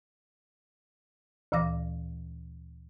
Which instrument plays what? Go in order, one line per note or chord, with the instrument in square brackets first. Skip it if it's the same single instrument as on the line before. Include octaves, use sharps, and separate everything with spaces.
[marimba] D2 A#2 E3 F5 D6 A#6